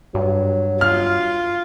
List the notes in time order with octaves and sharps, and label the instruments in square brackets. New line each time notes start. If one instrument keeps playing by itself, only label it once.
[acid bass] G2 [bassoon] F#3
[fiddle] F4 [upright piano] F6